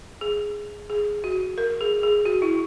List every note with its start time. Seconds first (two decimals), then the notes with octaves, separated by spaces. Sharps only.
0.21 G#4
0.90 G#4
1.24 F#4
1.58 A#4
1.81 G#4
2.03 G#4
2.25 F#4
2.42 E4